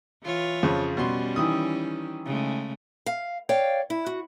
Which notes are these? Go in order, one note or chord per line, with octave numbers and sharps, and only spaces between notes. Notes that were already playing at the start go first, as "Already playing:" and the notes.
E3 F4 C#5
F2 C#3 F3
B2 G3 C#4 C6
D#3 E3 D#6
C#3 G#3 A3
F5
C#5 D5 F5 G5
E4
F#4